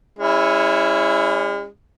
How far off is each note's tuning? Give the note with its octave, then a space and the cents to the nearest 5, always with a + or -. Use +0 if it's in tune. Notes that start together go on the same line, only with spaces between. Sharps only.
G#3 -45 C#4 +0 E4 +0